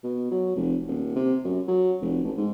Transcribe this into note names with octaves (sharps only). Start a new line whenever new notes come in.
B2
F#3
F1
D#1
C3
F#2
F#3
F1
A1
G#2